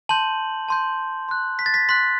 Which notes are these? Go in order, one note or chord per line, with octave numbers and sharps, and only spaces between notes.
A5 C6 G6 F#7
A5 C6 G6
C6 F#6
B6
A6
B6
C6 F#6 B6